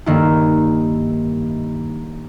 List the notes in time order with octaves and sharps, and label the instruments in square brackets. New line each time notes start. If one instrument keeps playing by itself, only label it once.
[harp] G2 D#3 A#3 E4